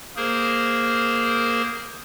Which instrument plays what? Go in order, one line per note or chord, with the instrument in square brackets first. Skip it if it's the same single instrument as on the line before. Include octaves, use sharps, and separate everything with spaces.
[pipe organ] A#3 G#4 A#4 C5